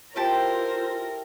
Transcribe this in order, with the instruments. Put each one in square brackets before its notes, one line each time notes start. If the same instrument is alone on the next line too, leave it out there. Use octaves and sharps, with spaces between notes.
[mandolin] E4 G4 A4 [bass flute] F4 [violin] A#4 [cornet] C5